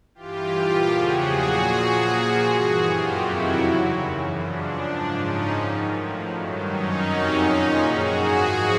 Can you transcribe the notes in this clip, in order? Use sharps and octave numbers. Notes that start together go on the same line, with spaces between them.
G2 E3 F4 G4
A#2 F3 F4 G4
E2 C#3 F3 F#4 G#4
A#2 F#3
A#2 F3
A#2 F3
G2 E3 F#4 G#4
F#2 D#3 F#3 F4 G4
F2 C3 D#3 F#3 E4 F#4
E2 C#3 F#3
F#2 C#3 E3
F#2 C#3 F3 D4
G#2 F3
G#2 F3 C#4 D#4
G#2 D#3 F#3
A2 F3
G2 D#3 F#3
F#2 D#3 F#3 C#4 D#4
F2 C3 D#3 F#3
A#2 F3
F#2 D#3 F#3 F#4 G#4
G#2 F3